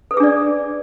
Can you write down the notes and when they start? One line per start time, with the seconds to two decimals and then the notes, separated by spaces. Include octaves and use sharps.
0.11 A4
0.14 B4
0.17 G#4
0.20 D4
0.23 D5